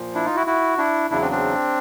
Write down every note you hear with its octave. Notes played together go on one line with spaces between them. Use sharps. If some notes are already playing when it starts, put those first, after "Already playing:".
Already playing: A#2 F3
D4 E4
D#4 F4
E4 F#4
E4 F#4
D4 E4
E2 C#3 F#3 D4 E4
C4 D4
C4 D4